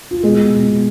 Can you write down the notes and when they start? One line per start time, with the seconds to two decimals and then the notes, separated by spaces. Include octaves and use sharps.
0.11 F4
0.23 B2 G#3 G#4
0.38 B2
0.54 B2
0.69 B2